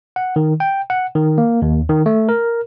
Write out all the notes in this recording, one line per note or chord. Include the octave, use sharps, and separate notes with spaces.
F#5
D#3
G5
F#5
D#3
A#3
D#2
D#3
A3
A#4